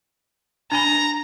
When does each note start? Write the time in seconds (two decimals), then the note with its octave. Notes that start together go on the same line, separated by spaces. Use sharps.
0.72 D4 G#5 A#5 B5